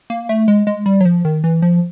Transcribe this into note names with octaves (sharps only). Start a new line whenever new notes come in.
A#3
A3
G#3
G#3
G3
F#3
F3
D#3
E3
F3